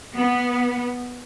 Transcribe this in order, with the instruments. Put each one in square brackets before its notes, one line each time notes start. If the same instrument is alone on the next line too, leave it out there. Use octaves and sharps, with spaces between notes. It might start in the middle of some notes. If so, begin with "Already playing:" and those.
[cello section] B3